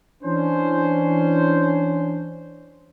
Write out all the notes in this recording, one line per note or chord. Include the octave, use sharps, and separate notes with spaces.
E3 C#4 D4 C5